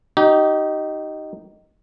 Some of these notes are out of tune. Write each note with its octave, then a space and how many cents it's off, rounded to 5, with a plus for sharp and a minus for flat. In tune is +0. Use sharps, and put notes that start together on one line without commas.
D#4 +0 G4 -30